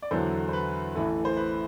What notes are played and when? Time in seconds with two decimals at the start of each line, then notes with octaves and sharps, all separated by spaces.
0.02 D5
0.11 E2 D3 F#3 A4 C5
0.49 C5
0.53 B4
0.95 A1 A2 E3 A4
1.25 C5
1.37 B4